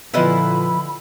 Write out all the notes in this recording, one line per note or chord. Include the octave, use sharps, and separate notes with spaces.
A#2 D3 F3 B3 E4 B4 D#5 B5